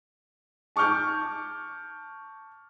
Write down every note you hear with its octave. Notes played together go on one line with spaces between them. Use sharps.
A5 C#6 D6 F6 G6